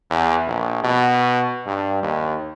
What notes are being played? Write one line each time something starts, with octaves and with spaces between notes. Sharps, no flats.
E2
A#1
B2
G2
D#2